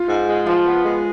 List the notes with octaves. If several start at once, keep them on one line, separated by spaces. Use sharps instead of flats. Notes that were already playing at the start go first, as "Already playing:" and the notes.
Already playing: F4
G#2
G#3
F3 F4
B3
G#3